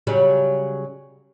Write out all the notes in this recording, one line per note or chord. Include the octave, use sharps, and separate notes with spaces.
C#3 F#3 G3